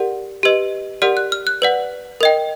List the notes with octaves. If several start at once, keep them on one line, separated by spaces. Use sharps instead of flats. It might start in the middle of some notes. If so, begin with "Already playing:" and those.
Already playing: G4 A#4 D5 F#5
G4 B4 D#5
G4 A#4 D5 F#5 F6
F#6
F6
F#6
B4 D5 F#5
A#4 D#5 G5